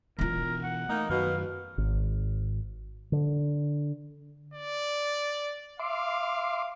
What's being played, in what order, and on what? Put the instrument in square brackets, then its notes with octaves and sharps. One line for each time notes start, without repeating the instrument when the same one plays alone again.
[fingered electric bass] B2 E3 [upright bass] B3 F4 [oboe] A#4
[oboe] F#5
[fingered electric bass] A3 [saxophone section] A#3 D#4
[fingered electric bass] F#2 D#3 F#3 [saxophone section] B2 [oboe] F5
[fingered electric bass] G#1
D3
[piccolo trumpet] D5
[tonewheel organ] E5 C6 D6 [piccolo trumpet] F5